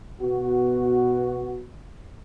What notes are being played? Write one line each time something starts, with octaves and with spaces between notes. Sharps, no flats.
B2 B3 F#4